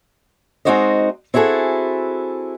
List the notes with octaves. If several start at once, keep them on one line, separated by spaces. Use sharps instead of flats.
G#3 C4 D#4 F#4 C5 D#5
C4 E4 F#4 G#4 A4